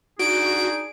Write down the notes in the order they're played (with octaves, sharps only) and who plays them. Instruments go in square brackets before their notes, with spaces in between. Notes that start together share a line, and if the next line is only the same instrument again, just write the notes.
[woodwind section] D4 D#4 G#4 [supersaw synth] F#4 [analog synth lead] D7